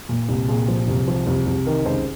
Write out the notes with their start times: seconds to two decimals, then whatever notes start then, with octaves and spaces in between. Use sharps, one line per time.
0.09 A#2
0.29 C2
0.49 A#2 G#4
0.68 F3
0.88 C2
1.08 F3
1.27 C2
1.46 C2
1.66 D#3 A#4
1.86 C#2 C5